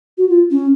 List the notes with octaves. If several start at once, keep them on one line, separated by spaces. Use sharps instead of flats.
F#4
F4
C#4